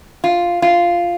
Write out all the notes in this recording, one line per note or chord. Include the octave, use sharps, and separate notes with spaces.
F4
F4